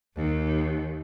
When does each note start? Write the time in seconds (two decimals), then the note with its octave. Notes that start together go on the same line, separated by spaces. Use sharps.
0.15 D#2